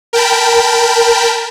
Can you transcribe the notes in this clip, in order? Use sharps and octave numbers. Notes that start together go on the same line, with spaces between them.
A#4 G5 A5 B5